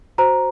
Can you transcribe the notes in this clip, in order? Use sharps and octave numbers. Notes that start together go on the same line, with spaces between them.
F#4 C5 A#5